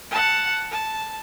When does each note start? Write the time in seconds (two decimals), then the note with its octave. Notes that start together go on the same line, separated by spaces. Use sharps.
0.11 F#5 A5
0.71 A5